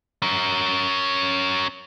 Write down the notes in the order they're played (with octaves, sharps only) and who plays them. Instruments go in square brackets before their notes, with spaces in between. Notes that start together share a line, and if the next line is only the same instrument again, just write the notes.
[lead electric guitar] C#4 A#4